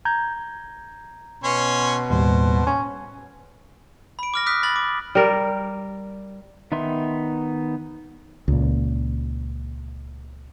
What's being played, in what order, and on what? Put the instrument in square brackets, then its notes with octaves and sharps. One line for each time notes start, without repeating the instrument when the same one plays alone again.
[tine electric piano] A#5 G6 G#6
[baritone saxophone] B2 [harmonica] C#4 C#5 C6
[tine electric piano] D#2 A2 G3 [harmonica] C5
[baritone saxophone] C#4
[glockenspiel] B5 D7
D6 F6 A#6
D6 D#6 F6 F#6 B6
B5 A6 F#7
D6
[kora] G3 A#4 D5
[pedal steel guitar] D#3 B3 D#4 E5 C6
[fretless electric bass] C#2 A#2